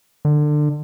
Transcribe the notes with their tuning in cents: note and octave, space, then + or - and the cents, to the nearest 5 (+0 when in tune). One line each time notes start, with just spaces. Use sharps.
D3 +25